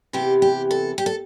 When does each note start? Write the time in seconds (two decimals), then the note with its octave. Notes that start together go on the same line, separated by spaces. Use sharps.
0.13 E2 C3 E3 G4
0.42 G4
0.71 A4
0.98 G4
1.06 A4